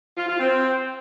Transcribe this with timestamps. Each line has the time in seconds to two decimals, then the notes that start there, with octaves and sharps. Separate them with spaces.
0.18 F4
0.29 F4
0.40 C4